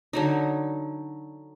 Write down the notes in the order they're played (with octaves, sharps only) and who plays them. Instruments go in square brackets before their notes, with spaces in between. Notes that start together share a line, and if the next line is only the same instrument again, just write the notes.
[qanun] D3 F#3 D#4